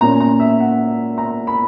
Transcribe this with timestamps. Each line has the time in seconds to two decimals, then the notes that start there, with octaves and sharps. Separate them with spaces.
0.01 A#2 A#3 C#4 A#5
0.20 A#5
0.40 E5
0.60 F#5
1.18 A#5
1.47 B5